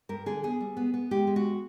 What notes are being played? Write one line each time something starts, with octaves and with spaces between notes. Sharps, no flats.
G2 A#4
D3 G#4
B3 G#4
G3
B3
B3
G#3 G4
G#3
F#4